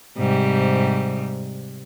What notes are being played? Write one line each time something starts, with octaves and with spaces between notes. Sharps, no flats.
G#2 C3 G3